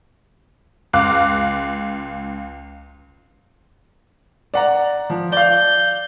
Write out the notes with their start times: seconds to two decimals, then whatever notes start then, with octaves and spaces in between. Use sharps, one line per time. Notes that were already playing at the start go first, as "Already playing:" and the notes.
0.93 C#2 F5 D6 F#6
4.54 D5 F#5 A#5
5.10 F3
5.32 D5 F5 G6